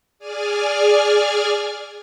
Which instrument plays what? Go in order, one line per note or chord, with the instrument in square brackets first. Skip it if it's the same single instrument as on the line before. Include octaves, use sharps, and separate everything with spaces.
[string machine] G#4 D5 G#5 F6